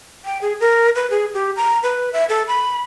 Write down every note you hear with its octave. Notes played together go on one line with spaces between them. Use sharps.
G5
G#4
A#4
B4
G#4
G4
A#5
B4
E5
A4
B5